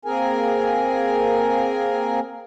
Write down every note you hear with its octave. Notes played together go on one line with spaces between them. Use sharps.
A#3 C4 G#4 A#4 G#5